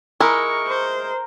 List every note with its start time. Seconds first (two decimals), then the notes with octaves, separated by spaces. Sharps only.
0.20 G#3 E4 A#4 C#6
0.67 C5